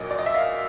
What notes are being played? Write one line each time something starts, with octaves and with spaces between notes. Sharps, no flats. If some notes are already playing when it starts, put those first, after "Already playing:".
Already playing: A#1 A#2 F#3 D#5
D5
D#5
E5
D#5 F5